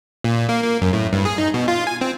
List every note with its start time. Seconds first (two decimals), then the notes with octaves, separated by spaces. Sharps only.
0.24 A#2
0.49 A#3
0.64 A#3
0.81 F#2
0.93 A2
1.13 G2
1.25 G#4
1.38 D#4
1.54 B2
1.68 F4
1.87 G#5
2.01 C4